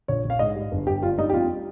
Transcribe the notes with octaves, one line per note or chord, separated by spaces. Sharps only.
A#1 C#5
A#1
F5
G#2 D#5
G3
G1
G1 G4
G2 F4
G3 D#4
G4
F2 F4